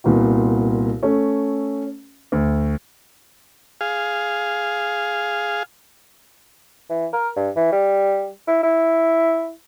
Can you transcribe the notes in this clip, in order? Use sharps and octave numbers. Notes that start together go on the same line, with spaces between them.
C2 A#2 B3 F#4
A3 C#4 A4
D2
G#4 F5
E3
A#4
G2
E3
G3
E4
E4